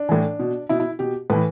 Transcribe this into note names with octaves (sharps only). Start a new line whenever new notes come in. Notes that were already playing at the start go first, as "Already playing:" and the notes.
Already playing: D4
A2 E3
B2
B2 E4
E4
B2 G4
A2 E3 B4